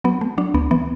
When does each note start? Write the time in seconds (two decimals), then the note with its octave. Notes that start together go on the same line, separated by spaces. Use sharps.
0.04 F#3 B3
0.21 A3
0.38 F#3 D4
0.54 D2 B3
0.71 E3 B3